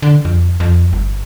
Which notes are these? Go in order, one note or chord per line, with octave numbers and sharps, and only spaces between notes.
D3
F2
F2
G1